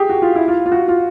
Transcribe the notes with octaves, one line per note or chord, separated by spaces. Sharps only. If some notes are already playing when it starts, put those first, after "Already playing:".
Already playing: G4 G#4
F#4
F4
E4
F4
F4
F#4
F4